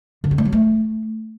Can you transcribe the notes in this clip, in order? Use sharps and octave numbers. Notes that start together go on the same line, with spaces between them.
D3
C4
G#3
F#3
A3